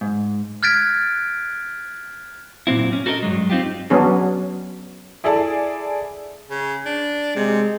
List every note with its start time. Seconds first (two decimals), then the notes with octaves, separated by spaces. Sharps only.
0.01 G#2
0.63 F6 F#6 G#6 A6 B6 D7
2.67 A#2 F#3 C4 E4
2.92 C#4
3.06 F#4 A4 A#4 C5 D#5
3.23 G2 C#3 F#3 G#3
3.50 C4 D#4 F4 G4
3.90 F#3 B3 C#4 D4 G#4
5.24 E4 G#4 A4 D5 A5
6.50 C#3
6.85 D4
7.36 C3 G#3